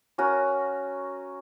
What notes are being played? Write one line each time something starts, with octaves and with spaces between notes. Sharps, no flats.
C#4 F#4 A#4